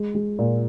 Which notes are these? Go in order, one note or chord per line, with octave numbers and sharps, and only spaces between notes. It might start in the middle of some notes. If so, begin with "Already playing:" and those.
Already playing: G#3
G#3
A#2